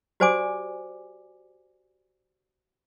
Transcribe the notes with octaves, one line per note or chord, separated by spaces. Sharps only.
F#4 G4 C5 D5 G#5 D6